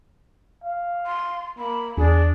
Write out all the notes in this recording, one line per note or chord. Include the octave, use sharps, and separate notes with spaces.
F5
C6
A#3 B5
E2 D4 G#4